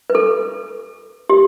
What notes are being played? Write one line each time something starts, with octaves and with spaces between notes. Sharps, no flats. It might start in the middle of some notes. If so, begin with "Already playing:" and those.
B4
A4
G4